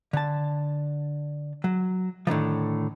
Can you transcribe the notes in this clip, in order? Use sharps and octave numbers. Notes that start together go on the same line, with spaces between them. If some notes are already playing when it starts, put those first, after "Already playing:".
D3 A5
F#3
A2 D3 D#3 F3